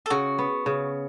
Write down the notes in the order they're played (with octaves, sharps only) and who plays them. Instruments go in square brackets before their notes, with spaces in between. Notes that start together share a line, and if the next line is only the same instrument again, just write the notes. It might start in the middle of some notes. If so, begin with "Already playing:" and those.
[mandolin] A4
[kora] C#3 [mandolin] F#4
[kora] B3
C#3